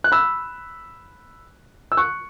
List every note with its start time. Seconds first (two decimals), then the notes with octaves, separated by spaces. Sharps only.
0.04 F#6
0.12 B5 E6
1.92 E6
1.97 C#6 F#6